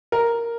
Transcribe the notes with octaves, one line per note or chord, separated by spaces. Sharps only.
A#4